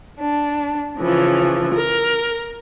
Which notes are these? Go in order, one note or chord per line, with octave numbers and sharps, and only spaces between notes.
D4
C#3 E3 F3
A#4